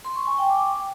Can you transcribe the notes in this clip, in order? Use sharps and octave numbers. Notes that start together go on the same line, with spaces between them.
C6
C#6
G#5
G5
D6